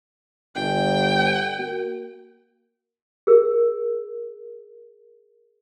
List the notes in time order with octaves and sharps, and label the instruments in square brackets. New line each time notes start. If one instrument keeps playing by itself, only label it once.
[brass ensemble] G1 [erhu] G5
[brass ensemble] A#3 F#4
[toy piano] G#4 A#4